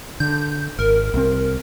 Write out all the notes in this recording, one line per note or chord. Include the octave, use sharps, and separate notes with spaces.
D3 G6
G#1 A#4
C2 C4